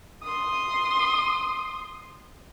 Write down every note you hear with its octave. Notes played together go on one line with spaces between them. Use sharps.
C6 D#6